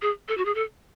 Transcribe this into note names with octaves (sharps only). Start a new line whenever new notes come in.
G#4
A4
F#4
G#4
A4